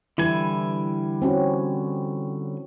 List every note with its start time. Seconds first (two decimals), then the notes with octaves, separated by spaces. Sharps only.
0.18 D3 E3 G3 E4 G#5
1.22 C4 C#4 F#4